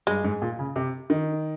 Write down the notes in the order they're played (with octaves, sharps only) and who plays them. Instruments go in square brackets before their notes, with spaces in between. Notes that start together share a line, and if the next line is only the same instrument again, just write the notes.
[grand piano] G2 [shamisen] G#3
[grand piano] G#2
A#2
C#3
C3
D#3